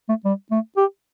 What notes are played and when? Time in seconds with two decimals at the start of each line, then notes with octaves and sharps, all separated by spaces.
0.09 A3
0.25 G3
0.51 A3
0.77 G4